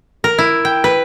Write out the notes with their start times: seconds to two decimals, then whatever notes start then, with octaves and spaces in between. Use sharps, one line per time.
0.24 A#4
0.38 E4
0.65 G5
0.84 B4